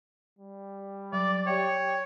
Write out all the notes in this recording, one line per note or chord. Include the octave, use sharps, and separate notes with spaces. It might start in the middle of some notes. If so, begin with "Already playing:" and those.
G3
F#3 D5
G4 C#5 D5 E5 G5